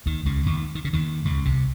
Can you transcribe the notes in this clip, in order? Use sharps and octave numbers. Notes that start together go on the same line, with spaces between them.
D#2 D#3
C#2 C#3
D#2 D#3
D#3
C#3
D#2 D#3
C#2 C#3
C2 C3